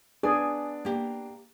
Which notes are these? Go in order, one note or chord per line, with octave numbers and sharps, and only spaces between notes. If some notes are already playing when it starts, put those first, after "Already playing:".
B3 D4 G#4 D5 G#5
A#3 G4